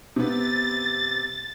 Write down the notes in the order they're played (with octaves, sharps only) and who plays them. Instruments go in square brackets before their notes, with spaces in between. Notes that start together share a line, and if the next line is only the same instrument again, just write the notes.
[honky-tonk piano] C3 B3 [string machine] A6